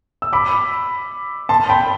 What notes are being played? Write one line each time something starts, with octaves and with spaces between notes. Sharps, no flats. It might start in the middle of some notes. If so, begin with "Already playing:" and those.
E6
B5 D6
A5 C6
G5 B5